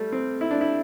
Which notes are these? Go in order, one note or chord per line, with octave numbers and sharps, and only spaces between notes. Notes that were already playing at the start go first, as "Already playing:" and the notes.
Already playing: G3 A3
C4
E4
D4
E4